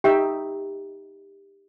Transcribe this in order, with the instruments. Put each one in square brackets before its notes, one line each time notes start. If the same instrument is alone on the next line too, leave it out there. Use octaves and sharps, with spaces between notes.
[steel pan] D#4 E5 G5 [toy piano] G4